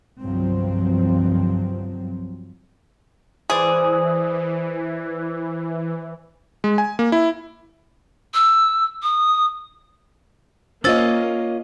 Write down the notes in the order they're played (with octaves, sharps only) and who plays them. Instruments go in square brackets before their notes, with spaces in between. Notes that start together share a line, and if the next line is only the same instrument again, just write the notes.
[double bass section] G1 C2 G2 F3 F#3 C4
[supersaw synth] E3 [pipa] G#4 [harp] C5 D5
[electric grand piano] G#3
G#5
A#3
E4
[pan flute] E6
D#6
[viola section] A#3 [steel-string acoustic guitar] C#4 F4 D#5 [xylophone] C5 E6 A6